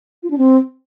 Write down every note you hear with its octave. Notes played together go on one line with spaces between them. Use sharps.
F4
D4
C4